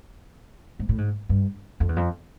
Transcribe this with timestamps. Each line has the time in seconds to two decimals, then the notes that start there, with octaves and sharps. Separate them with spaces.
0.79 G#2
0.89 A2
0.98 G#2
1.29 G2
1.80 F2
1.89 E2
1.96 F2